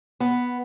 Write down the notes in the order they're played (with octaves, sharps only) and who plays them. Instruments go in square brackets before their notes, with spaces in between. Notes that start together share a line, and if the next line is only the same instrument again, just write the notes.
[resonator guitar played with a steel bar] B3